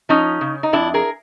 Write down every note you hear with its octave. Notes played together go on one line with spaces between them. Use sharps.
F3 C#4 D#4
C#3
D#4
F2 D4 E4
G#4 A#4